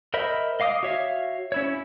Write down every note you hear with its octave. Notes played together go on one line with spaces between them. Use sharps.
A#4 C5 D#5 E5 B5
D#5 F5 D6 D#6
F#4 C#5 E5 F5
C#4 E4 C#5